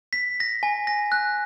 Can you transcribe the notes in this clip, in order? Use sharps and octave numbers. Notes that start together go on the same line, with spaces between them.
B6
A#6
G#5
A#6
F#6